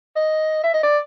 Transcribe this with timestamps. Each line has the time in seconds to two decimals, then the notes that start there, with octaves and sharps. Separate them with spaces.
0.16 D#5
0.63 E5
0.74 D#5
0.83 D5